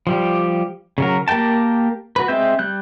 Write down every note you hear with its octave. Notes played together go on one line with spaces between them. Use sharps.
F3 G3 G4
C#3 F#3 A#4
A#3 G4 A#4 G5 A5
F#4 B4
G#3 C4 E5 G6
G3 F#6 G6